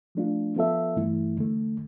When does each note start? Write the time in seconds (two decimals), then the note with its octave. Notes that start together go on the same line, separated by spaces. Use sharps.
0.15 F3 A3 D4 F4
0.56 F3 B3 F4 A4 E5
0.96 G2 E3 A3 E4
1.37 E2 D3 A3